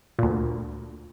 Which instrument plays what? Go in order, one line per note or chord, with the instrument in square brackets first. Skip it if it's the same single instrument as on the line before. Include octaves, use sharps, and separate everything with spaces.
[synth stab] D2 A#2